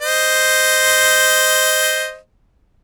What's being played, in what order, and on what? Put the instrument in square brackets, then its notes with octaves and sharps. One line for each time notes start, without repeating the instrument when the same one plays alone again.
[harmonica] C5 D#5